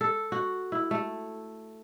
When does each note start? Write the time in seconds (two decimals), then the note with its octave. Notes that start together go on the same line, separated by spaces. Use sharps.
0.01 A4
0.32 F#4
0.72 E4
0.91 A3